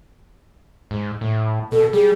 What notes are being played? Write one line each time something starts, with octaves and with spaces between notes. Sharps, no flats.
G#2
A2
B2 A4
G3 G#4